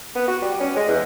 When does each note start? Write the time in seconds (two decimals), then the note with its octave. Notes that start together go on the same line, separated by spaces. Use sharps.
0.15 B3
0.28 F#4
0.42 G3
0.60 C#4
0.76 G#3
0.88 E2